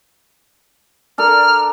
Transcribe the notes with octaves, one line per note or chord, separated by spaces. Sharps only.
D4 A4 A#4 F6